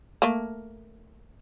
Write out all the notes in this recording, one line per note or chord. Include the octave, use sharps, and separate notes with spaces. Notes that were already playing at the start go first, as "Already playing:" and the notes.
A3 A#3